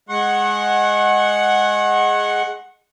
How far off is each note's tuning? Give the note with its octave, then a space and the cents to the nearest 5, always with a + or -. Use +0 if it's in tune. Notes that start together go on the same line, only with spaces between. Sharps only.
G#3 +0 F#5 +0 C#6 -40